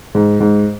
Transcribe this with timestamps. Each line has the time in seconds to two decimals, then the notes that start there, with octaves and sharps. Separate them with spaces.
0.15 G#2
0.40 G#2